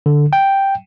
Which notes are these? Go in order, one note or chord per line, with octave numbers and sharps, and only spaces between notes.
D3
G5